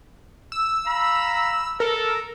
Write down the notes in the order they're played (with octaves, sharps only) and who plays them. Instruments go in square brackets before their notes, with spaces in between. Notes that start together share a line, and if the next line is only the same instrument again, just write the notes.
[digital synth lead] E6
[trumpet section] F5 A#5 B5
[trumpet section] A4 [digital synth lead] A#4